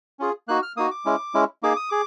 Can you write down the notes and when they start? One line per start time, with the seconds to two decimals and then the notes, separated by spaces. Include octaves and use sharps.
0.19 C#4 F4 G#4
0.48 A#3 D#4 F#4 F#6
0.63 F6
0.77 A#3 D#4 F#4 D#6
0.91 D6
1.05 G#3 C#4 E4
1.34 G#3 C#4 E4
1.63 A#3 D#4 G#4 D6
1.76 D#6
1.90 G#4 D6